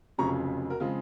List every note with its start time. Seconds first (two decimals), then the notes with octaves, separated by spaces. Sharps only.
0.18 F1 F2 C#3 F#3 C#4 A#5 C#6
0.70 F#4 A#4
0.80 C#3 F3 G#3 C4 F4